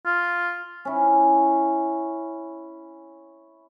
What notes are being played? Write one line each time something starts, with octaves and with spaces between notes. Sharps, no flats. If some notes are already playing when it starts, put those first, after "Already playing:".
F4
C#4 E4